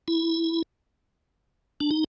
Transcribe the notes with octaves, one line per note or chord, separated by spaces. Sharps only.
E4
D4
D#4